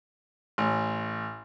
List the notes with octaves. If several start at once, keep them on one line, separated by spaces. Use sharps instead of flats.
A1